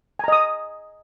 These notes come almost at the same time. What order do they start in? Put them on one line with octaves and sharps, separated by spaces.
G#5 A#5 D#5 D#6